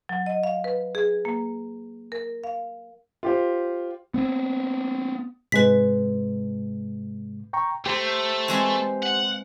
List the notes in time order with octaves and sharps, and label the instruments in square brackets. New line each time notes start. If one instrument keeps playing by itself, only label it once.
[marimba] F#3
D#5
F5
B4
G#4
A#3
A#4
F5
[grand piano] F4 G4 C5
[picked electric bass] B3 C4
[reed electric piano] G#2 C3 G#3 [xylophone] B4 B6
[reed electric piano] G5 A#5 C#6
[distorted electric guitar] A3 [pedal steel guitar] G4 C5 A#5
[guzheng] E3 G#3 C4
[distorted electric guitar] F#5